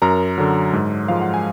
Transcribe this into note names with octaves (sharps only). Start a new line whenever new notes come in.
F#2 A#4 A#5
D3 F#3
G#2
F3 G#3 F5
F#5
G#5